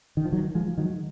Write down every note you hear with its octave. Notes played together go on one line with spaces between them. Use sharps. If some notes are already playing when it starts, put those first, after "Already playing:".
D#3
F3
D#3 F#3
F3 G#3
D#3 F#3